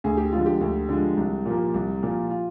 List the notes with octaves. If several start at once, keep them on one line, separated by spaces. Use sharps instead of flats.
D2 G#4
G4
D3 F3 G#3 F4
G4
D2
D3 F3 G#3
C2
A#2 F3 A#3
C2
A#2 F3 A#3
F4